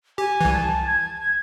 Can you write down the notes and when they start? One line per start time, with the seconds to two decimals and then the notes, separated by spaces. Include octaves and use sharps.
0.18 G4 G#5
0.41 C2 E3
0.53 A5
0.87 G#6